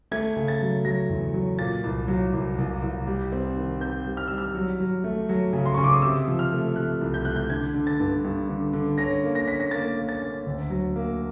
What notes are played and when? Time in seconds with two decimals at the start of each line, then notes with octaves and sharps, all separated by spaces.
0.11 A3 G#6
0.36 C#3
0.48 A6
0.61 F#3
0.85 F#3 A#6
1.09 E2
1.34 F#3
1.59 A#2 A6
1.84 C2
2.08 F#3
2.33 C2
2.58 C2
2.82 C2
3.07 G3
3.32 C4
3.56 D#3
3.80 C4 G6
4.06 G3
4.17 F6
4.28 G3 E6
4.38 F6
4.55 F#3
4.80 F#3
5.04 A3
5.29 F#3
5.53 C#3
5.66 C6
5.74 C#3 C#6
5.84 D6
5.93 D#6
6.02 C3 E6
6.28 F3
6.39 F6
6.52 A3
6.76 C3 F#6
7.01 C2
7.14 G6
7.25 A3 F#6
7.36 G6
7.50 D3 G#6
7.74 D3
7.87 A6
8.00 G2
8.24 G2
8.49 D3
8.73 D3
8.98 C#4 A#6
9.23 A#3
9.35 A#6
9.47 C#4 B6
9.60 A#6
9.71 A#3 A6
9.96 A#3
10.09 A6
10.22 C#4
10.46 D2
10.70 F#3
10.96 A#3